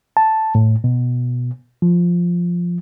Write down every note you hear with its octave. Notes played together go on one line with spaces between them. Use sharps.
A5
A2
B2
F3